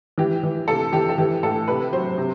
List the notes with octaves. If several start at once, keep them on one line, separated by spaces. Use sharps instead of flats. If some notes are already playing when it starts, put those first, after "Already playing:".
E3 G4
E3
C3 A4
E3 G4
A4
E3 G4
A2 A4
C3 B4
F#3 C5
C3